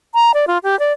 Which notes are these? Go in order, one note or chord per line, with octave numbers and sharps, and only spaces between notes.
A#5
D5
F4
G4
D5